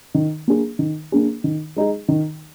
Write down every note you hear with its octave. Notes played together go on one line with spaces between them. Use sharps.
D#3
A#3 D4 G#4
D#3
A#3 D4 G#4
D#3
G#3 D#4 G#4
D#3